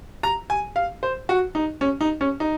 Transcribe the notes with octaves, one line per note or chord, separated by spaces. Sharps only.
A#5
G#5
F5
C5
F#4
D#4
C#4
D#4
C#4
D#4